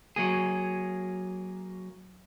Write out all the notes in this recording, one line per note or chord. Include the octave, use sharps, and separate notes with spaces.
F#3 A#3 G#4